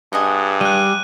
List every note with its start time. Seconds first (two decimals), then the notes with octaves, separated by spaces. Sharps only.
0.13 G2 G#4 D#5 F#5
0.61 G3 F#6 D#7